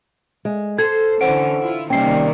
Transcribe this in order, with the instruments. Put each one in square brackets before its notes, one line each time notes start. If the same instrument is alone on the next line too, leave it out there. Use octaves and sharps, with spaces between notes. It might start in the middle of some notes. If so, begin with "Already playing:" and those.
[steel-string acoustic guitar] G#3
[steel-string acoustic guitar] A4 [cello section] C5 [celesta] G#6
[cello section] D3 E3 C#4 [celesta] C5 F#5 D7
[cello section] E4 F4
[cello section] C3 D#3 A#3 [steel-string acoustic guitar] G3 C#4 [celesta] G5 C7